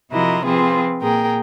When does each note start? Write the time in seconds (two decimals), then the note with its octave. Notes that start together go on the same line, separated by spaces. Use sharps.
0.11 C3 F3 E4 F#4 A#4 D#5
0.45 F3 C4 F4 G#4 B4
1.01 A#2 G#4 A#4 G5